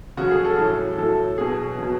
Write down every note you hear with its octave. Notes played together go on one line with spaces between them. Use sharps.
C#3 F#3 F#4
G#4
A4
A2 F#3
A2 F#3 A4
B2 F#3 G#4
B2 F#3